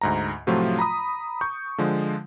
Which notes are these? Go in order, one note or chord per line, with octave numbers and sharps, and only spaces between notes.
D2 G#2 A#5
A2 C3 F3 F#3 A3 F4
A#5 B5 D#6
C#6 G6
D3 F3 G#3